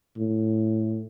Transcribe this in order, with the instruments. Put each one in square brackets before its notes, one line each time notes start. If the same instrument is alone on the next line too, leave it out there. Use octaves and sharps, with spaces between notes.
[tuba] A2